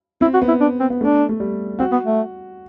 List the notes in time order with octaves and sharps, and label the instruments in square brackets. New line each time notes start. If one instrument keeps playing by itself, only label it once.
[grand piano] C4 [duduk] E4
[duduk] F#4
[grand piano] B3
[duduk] E4
D4
C4
[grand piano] B3
[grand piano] A3 [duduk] D4
[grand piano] A3
G3
[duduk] C4 [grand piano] F#4
[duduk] B3
A3